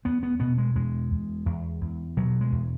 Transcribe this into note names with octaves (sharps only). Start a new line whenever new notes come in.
E2 B3
B3
B2 B3
G#3
E2 G#3
E2
E2
E2
B2 F#3
G#3
E2